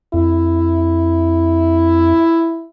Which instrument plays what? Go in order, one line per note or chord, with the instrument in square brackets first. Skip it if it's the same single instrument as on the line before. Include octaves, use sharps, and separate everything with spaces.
[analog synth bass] F2 [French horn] E4